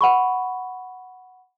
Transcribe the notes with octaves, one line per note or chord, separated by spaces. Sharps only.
F#5 B5 C#6